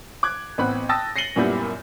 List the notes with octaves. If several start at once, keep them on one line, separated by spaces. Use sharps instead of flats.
D6 F#6 G#6
A1 B3 C4 B5 F#6
G5 A5 D#6 E6 A6 A#6
A#6 C7 C#7 D#7 F#7 G7
F#2 A#2 G3 B3 E4 G6